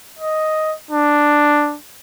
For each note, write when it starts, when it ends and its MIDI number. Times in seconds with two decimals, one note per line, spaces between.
0.19 0.74 75
0.91 1.75 62